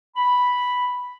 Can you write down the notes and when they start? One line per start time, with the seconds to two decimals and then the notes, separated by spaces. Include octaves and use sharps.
0.16 B5